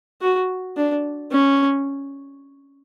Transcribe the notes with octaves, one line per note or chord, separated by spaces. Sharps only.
F#4
D4
C#4